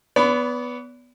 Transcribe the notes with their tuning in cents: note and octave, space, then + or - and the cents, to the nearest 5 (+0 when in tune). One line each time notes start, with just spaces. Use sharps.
B3 +0 D5 -40 B5 +20